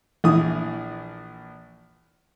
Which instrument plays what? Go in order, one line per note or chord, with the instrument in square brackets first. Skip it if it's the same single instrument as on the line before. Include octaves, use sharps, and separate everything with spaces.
[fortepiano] A#1 E3 D#6